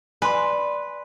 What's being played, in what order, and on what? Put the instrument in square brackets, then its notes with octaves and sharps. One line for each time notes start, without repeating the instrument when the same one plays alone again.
[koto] B4 [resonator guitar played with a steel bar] D5 [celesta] G#5 C6